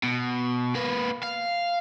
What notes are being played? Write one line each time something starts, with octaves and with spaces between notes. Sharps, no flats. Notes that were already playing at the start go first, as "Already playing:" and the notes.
B2
A#3 B4
F5